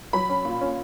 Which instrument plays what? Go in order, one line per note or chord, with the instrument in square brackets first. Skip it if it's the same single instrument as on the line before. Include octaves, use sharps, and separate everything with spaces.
[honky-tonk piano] F#3 B5
C#4
A#2
C#4